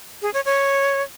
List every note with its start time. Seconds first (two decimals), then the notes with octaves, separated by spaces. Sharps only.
0.22 G#4
0.34 C#5
0.45 C#5